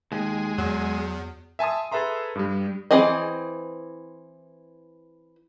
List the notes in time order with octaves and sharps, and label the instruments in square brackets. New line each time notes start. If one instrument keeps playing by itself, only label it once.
[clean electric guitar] D#2 [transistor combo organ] G#3
[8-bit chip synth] E2 [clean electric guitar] F#3
[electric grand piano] E5 G#5 A5 C6 D#6
G#4 A4 B4 E5 A#5 C6
G2 G3
[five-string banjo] E3 C4 G#4 D#5